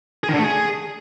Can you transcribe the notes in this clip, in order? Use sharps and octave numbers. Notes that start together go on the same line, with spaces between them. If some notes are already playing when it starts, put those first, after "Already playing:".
G#4
D#3
D3
A3
G#4